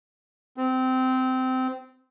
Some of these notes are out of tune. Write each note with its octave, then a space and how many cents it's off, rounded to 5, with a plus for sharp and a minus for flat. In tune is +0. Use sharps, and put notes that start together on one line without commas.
C4 -20